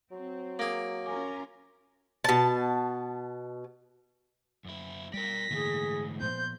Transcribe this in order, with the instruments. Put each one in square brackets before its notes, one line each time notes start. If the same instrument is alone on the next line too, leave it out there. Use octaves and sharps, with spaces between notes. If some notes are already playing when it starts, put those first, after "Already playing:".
[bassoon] F#3 [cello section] C4
[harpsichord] A#3 G#4 [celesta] D6 A#6 D7
[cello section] C#4 F4 A#4 [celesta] G#5 D6
[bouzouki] B2 A5
[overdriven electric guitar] F#2 E4
[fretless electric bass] G3 [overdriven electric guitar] A#4 D5 [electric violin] A#6 B6
[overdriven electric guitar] G#2 A3 [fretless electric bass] D3 E3 A#3 [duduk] G#4
[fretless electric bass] A#2 F3 B3 [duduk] C5 [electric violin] G6